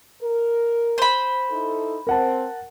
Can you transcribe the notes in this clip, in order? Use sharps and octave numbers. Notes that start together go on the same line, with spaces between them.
A#4
C5 B5
D#4 E4 A4
C4 A#4 F#5 A5